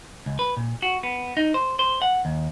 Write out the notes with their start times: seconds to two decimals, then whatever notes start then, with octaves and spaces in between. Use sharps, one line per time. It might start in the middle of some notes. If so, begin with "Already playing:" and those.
0.26 C#2
0.39 B4
0.57 A#2
0.82 F#4
1.03 B3
1.37 D#4
1.54 C5
1.79 C5
2.02 F#5
2.25 D#2